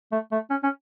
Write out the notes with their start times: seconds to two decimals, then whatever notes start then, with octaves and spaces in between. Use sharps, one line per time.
0.12 A3
0.32 A3
0.50 C#4
0.63 C#4